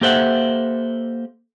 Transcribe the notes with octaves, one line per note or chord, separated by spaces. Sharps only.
A#3 G4 A4 C5 E5 F#5